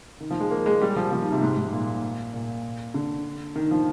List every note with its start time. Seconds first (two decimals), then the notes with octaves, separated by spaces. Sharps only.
0.21 D#3
0.31 F3
0.40 G#3
0.51 A#3
0.66 G#3
0.81 G3
0.96 F3
1.12 F3
1.22 D#3
1.32 C3
1.42 G#2
1.58 G#2
1.72 A#2
2.34 A#2
2.94 D3
3.56 D#3
3.71 F3